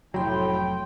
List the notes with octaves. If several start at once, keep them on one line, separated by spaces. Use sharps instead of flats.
F1 A2 F#3 G5 B5 C6